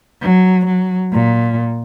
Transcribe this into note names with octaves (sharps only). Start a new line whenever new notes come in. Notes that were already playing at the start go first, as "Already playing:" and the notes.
F#3
F#3
A#2